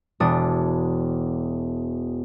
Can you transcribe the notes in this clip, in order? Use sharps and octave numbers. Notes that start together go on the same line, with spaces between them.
E1 D4 D#6